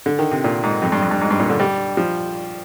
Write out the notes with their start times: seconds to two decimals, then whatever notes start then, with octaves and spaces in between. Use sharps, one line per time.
0.06 D3
0.19 D#3
0.31 C3
0.44 A#2
0.63 G#2
0.82 F2
0.92 G2
1.02 F2
1.11 G2
1.21 G#2
1.31 G2
1.40 A#2
1.50 D3
1.60 G3
1.97 F3